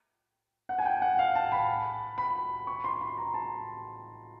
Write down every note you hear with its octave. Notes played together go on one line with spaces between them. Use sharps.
F#5
G#5
G5
F#5
F5
A5
B5
B5
C#6
C6
B5
A#5
A5